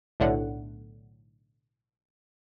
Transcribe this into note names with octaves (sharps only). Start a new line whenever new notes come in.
B1 A2 D3 F#5